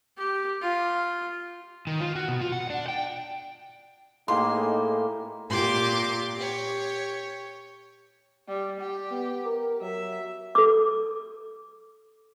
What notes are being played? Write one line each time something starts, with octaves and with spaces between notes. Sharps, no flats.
G4
F4
D#3
F4
F#4
B2
F4
F#5
D4
G5
A2 A#3 D#4 G4 G#4 C6
A#2 G4 C6 D6
G4 C#5
G3
G4
B3
A#4
F#3 E5
A4 D6